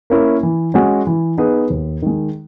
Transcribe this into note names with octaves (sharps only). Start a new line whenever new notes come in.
A#3 C#4 E4 A#4
E3
G#3 C#4 F#4
E3
B3 D#4 G#4 B4
D#2
D#3 G#3